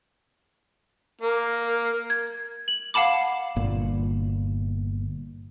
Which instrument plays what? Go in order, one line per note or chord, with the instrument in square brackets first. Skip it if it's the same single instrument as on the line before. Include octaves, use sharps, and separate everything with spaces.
[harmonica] A#3
[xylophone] G#6
F#7
F5 F#5 A5 B5 D6
[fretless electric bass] G1 A#2